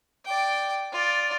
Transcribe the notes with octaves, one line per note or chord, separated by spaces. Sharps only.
D5 G5
F4 D5